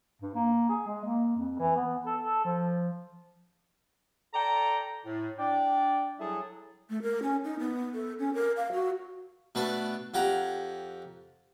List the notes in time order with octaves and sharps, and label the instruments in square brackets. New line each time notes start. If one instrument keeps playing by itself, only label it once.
[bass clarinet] G2
A#3
G#4
G#3
A#3
F2
E3
B3
A4
A4
F3
[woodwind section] A4 D5 G5 A#5
A2
D4 D5 G5
F#3 G3 E4 G#4 A4 E5
[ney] A3
A#4
C#4
D#4
B3
A4
C#4
A#4
F5
F#4
[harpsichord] B2 A3 D4 B4
F2 G4 F#5 A#5